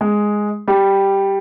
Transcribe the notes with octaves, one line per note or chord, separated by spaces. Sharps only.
G#3
G3